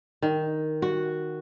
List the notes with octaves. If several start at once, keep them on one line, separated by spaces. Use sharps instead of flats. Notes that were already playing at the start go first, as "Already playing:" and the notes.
D#3
F#4